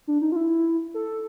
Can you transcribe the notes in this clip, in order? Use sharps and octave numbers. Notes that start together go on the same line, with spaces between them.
D4
D#4
F4
E4
A4